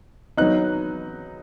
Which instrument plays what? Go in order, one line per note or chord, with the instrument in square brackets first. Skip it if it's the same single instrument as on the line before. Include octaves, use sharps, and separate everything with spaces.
[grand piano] F#3 B3 D#4 F#6